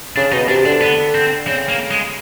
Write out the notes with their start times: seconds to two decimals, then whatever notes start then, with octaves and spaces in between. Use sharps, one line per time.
0.16 C#3 D4
0.32 B2 D#4
0.48 C3 D4
0.65 D3 D4
0.81 B3
1.15 C4
1.47 C#3 C4
1.68 A#3
1.91 G#3